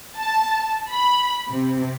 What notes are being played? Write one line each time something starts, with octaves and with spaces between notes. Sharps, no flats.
A5
B5
C3